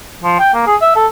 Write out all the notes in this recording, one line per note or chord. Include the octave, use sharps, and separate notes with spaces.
F3
G5
A#3
G#4
E5
A4